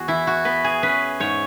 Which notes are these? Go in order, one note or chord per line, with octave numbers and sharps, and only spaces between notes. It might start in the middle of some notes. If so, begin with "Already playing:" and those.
Already playing: E2 F#4 G#4
E3 E4
F#4
B3 B4
G#4
C#4 B4
G#2 C#5